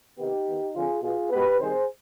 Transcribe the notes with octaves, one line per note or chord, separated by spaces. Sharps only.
C3 D#3 B3 D#4 G4
D#3 B3
D3 F3 C4 F4 G#4
B2 B3 F4 G#4
B2 G#3 B3 G4 B4
C3 D#3 G3 C4 G#4 C5